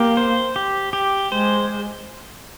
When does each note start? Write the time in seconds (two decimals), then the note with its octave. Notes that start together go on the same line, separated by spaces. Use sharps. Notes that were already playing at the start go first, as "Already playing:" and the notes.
Already playing: A#3 G4
0.17 C5
0.56 G4
0.93 G4
1.32 G#3 C5